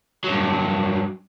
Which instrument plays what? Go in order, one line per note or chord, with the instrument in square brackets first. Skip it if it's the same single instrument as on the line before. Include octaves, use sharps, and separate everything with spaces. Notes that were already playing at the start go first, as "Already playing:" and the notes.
[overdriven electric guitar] G2 F#3